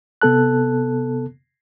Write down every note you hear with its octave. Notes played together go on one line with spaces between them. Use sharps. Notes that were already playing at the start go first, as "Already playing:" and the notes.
C3 B3 A4 A5 F#6